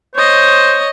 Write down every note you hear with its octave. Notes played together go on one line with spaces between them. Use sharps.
C5 C#5 D#5